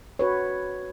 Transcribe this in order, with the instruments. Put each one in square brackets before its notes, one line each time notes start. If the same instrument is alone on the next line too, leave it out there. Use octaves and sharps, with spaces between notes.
[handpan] F#4 B4 C#5